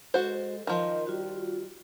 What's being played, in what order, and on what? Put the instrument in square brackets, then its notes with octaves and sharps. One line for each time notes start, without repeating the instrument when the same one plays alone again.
[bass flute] G#3 [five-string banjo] F#4 C5 [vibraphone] A4
[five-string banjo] D#3 F3 [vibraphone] A#4 C6 [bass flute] D#5
[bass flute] G3 [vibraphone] F4 F#4